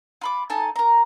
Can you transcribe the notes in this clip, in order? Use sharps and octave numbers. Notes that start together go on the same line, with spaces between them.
F4 B5 D6
D#4 A4 G#5 A5
A#4 A#5